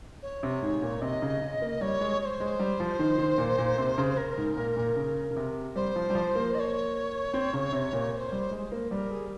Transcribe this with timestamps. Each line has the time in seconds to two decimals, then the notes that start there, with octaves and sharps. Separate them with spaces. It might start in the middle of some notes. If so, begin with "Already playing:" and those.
0.22 C#5
0.43 C3
0.62 G#2
0.82 A#2
1.01 C3 D#5
1.22 C#3
1.42 C#3
1.62 A#3
1.81 G3 C#5
2.01 G#3
2.21 C#5
2.25 C5
2.40 G#3
2.59 G3
2.80 F3
2.99 D#3
3.18 D#3
3.38 A#2
3.59 A#2
3.78 C3
3.98 C#3
4.17 A#4
4.38 G#2
4.57 A#2
4.77 A#2
4.96 C#3
5.31 C#3
5.37 C3
5.76 G3 C5
5.96 F3
6.10 G3
6.15 F3
6.35 A#3
6.54 D#5
6.59 C#5
7.34 C4
7.53 C#3
7.72 C3
7.93 A#2
8.12 C#5
8.16 C5
8.32 G3
8.51 G#3
8.72 A#3
8.91 G3 C5
8.96 A#4
9.11 G#4